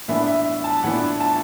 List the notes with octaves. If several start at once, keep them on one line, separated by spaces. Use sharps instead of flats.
A2 E3 B3 D4 E5
E5
E5
A5
A2 E3 B3 D4 F#5
A5